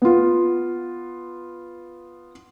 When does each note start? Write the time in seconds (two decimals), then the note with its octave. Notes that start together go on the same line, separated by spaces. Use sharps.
0.02 B3 F4